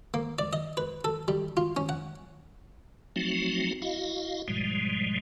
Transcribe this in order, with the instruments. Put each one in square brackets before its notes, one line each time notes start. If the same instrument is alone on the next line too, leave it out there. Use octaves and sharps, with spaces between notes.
[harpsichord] A#3
D5
D#5
B4
A4
G3
F4
C#4
F#5
[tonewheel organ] F3 F#3 A3 C4 D#4 F#4
E4 F#4 D#5 F5
G#2 B2 F3 G3 G#3